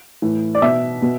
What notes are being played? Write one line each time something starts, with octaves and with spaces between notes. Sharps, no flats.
A2 E3
D5
B2 E5
B2